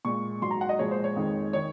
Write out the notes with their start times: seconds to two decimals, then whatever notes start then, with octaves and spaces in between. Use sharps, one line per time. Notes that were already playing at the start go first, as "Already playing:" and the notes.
0.05 A#2 G#3 C#6
0.42 G#2 F#3 C6
0.51 A#5
0.61 F#5
0.69 D#5
0.79 A#2 F3 G#3 C#5
0.91 C5
1.04 C#5
1.16 F2 D#3 G#3
1.53 D#3 C#5